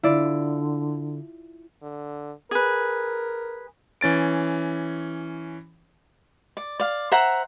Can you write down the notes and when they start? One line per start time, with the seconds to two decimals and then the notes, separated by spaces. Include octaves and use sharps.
0.03 D3 E4 F4 D5
1.83 D3
2.51 G#4 A#4 B4
4.01 E3 C#4 A6 D7
6.57 D5
6.80 D5 F5
7.12 C5 E5 F#5 A#5